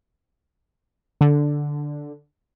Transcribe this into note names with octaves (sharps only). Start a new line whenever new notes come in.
D3